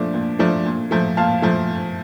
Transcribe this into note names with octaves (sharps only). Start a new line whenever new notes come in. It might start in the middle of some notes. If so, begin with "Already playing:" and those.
Already playing: A#2 F3 A3 D4
A#2
F3 A3 D4
A#2
F3 A3
A#2 F5 A5
F3 A3